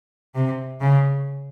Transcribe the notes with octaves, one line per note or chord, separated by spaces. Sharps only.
C3
C#3